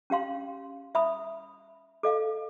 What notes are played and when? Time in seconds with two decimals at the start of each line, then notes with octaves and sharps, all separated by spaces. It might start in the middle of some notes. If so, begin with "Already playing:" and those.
0.10 C#4 G4 F5 C6
0.95 E5 B5 D#6
2.03 A4 D#5 F5